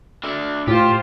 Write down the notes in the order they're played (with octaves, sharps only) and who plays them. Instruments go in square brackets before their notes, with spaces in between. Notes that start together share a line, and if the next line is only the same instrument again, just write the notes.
[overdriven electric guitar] D4 E5
[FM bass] A2 [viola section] F4 C5 [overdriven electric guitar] G4